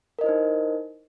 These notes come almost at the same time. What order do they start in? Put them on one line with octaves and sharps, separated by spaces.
A#4 D#5 E4 C5 D#4